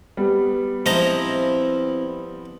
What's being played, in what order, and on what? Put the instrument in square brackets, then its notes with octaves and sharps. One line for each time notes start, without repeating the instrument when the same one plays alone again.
[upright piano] G3 B3
[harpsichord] F3 D#5 A#5 [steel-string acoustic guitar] C4 E4